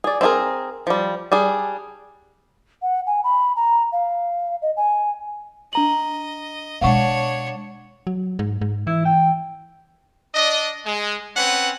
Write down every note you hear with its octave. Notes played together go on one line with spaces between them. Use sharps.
G#4 D5
C4 C#4 E4 G#4 A#4
F3 G3
G3 D4 G#4
F#5
G#5
B5
A#5
F5
D#5
G#5
D4 D#5 A#5 F#7
B2 G#3 D4 C#5 F5 F#5 C#6
F#3
G#2
G#2
E3 E4
G5
D4 D5 D#5
G#3
C4 C#4 B4 F#5